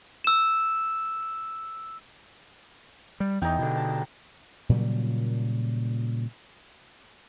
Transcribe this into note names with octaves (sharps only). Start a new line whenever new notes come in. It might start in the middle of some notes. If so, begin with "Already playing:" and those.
E6 E7
G3
E2 D#4 G5
B2 D3
A5
A#2 C#3 F#3 G3